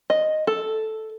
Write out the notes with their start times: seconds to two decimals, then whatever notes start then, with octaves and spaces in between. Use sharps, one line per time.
0.10 D#5
0.47 A4